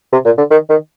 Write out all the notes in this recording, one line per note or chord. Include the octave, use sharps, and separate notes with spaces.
C3
A#2
D3
D#3
D#3